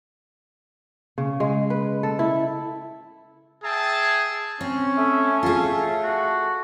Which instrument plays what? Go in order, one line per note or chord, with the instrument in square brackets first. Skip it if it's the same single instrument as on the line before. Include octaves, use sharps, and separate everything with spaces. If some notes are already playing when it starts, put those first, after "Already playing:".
[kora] C#3
G#3
B4
A4
E4
[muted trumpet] G#4 [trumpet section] E5 G5 A5
[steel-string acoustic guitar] C4 [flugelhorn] C#4
[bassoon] A3 [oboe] E5
[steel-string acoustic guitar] F4 G#4
[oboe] F#4